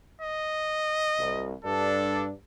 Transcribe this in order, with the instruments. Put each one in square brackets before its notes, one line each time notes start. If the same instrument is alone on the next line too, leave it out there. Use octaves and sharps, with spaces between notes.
[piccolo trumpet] D#5
[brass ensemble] C2
[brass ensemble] G2 D4 [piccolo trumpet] A4